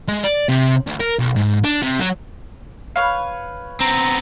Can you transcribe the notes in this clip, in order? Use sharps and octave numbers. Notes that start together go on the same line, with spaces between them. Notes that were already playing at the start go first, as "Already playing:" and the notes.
G#3
D5
C3
D2
A#4
B1
G#2
D4
C3
F#3
B4 C#5 F5
B3 C4 A#5